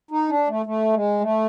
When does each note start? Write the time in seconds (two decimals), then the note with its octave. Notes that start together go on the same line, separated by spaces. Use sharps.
0.11 D#4
0.29 D4
0.48 A3
0.66 A3
0.94 G#3
1.21 A3